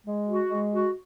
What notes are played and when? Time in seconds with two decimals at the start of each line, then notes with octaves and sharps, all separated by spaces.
0.06 G#3
0.28 F#4
0.50 G#3
0.71 F#4